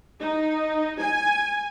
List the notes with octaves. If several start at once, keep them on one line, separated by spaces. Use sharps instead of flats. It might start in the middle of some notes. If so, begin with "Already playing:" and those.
D#4
G#5